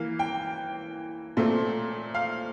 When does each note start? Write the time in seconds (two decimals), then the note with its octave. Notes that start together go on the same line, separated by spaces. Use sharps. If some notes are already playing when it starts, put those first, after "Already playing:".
Already playing: E3 A#3 F5
0.19 G5
1.37 A#2 A3 C4
2.15 F5